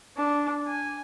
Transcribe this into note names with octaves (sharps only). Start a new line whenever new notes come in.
D4
G#5